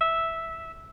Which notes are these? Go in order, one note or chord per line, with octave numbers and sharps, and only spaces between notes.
E5